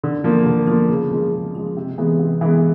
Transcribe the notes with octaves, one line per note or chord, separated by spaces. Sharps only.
D3
F3 A#3
D3
F3 A#3
C#3
F3 G#3
C#3
F3 G#3
C3
E3 G#3 B3
C3
E3 G#3 B3